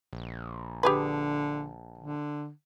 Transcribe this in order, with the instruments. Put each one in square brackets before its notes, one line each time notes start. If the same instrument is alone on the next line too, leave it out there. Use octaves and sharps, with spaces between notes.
[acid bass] A#1
[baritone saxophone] D3 [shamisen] G4 G#4 B4
[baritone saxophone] D3